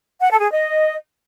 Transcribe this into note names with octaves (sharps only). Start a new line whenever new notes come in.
F#5
A4
G#4
D#5